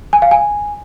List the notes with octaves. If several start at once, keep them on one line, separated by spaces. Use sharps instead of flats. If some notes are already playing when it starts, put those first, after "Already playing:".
G#5
F5
G#5